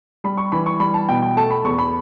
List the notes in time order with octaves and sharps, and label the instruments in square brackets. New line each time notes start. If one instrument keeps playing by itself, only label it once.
[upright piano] G3 B5
C#6
E3 B5
C#6
G3 B5
A5
B2 G5
G5
A3 A5
B5
E2 C#6
B5